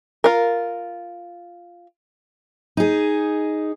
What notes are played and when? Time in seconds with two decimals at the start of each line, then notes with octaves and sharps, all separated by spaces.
0.24 F4 A#4
2.77 D#4 G#4